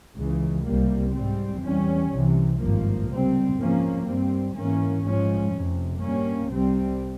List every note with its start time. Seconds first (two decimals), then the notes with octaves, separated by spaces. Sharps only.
0.16 C#2 C#3 E3
0.65 C2 C3 G3 A#3
1.13 G#2 G3 C4
1.62 E2 E3 G3 C#4
2.11 C2 C3 E3
2.60 G#1 G2 F3 A#3
3.08 C#2 C3 G3 C4
3.57 G#2 F3 A#3 C#4
4.06 G2 G3 C4
4.55 G#2 E3 A#3 C#4
5.04 G#2 F3 G#3 C#4
5.53 F1 F2 C3
6.02 G2 G3 A#3 C#4
6.51 C2 C3 G3 C4